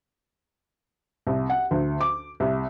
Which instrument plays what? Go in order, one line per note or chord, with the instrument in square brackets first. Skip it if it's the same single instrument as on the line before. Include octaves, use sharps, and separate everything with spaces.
[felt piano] C2
F#5
D2
D6
C2